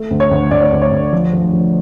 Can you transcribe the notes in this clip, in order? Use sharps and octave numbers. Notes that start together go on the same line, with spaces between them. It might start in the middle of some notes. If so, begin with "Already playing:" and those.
Already playing: A3
D2
C#5
D2
D2 D5
C#5
D2
C#5
D2
F3
F3
F3